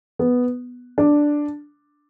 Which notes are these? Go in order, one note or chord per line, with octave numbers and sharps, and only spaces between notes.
B3
D4